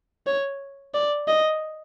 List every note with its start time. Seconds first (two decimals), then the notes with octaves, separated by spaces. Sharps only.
0.27 C#5
0.94 D5
1.28 D#5